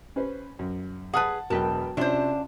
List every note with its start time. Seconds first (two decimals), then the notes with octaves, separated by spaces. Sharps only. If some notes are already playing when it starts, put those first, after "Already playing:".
0.16 C#4 B4 C5
0.59 F#2
1.13 G#4 A#4 B4 F#5 A5
1.50 E1 F#3 A#4 B4 G5 A5
1.97 C3 C#4 D4 F4 C5